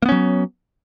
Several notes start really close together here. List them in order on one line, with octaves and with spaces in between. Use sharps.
A#3 B3 C#4 F#3